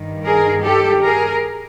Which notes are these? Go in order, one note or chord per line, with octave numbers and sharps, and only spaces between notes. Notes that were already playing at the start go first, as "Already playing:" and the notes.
Already playing: G2 D#3
G#4 A#4
G4 A4
G#4 A#4